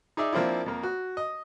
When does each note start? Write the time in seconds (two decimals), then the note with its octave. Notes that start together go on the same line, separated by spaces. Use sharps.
0.17 D#4 G#4 D5 E5
0.33 F3 A#3 C4 D4 E4
0.66 F2 A#3
0.83 F#4
1.17 D#5